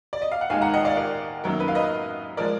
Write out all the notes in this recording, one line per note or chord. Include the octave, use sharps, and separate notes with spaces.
D5
D#5
F5
F#5
D#2 D#3 G#3 F5 G#5
F#5 A#5
D#5 F#5
D5 F5
A#4 D5
F#2 D#3 F#3 A#3 A#4
B4
F5
B4 D#5
F3 G#3 A#4 D5